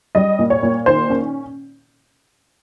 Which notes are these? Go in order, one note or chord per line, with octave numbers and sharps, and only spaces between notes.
G3 D#5
A#2
C#5
A#2
D#3 C5
C#4